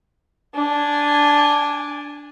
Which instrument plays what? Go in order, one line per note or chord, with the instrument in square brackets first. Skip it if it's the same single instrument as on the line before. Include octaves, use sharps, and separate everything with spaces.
[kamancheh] D4 G#5